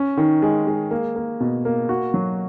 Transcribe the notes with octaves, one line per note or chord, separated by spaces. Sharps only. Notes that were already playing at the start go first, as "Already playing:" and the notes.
Already playing: C#4
D#3
G#3
G#3
A#3
A#3
B2
A#3
F#4
F#3